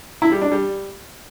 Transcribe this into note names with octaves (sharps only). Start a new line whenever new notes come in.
E4
G3
D4
G3